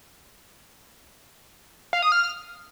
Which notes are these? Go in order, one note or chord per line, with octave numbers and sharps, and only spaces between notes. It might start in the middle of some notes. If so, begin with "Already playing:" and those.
F5
D#6
F6